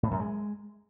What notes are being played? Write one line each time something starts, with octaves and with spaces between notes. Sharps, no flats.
A2
F#2
G#3